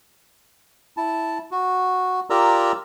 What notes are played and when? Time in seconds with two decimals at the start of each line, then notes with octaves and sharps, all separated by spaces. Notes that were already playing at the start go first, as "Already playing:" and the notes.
0.97 E4 A5
1.51 F#4
2.30 F4 G4 A#4 D5 A#5 E6